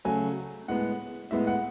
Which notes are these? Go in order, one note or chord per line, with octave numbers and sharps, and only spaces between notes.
C#3 F#3 A3 G#5
A2 G#3 B3 F#5
A2 G#3 B3 E5
F#5